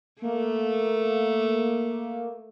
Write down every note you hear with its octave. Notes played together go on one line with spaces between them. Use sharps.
A3 A#3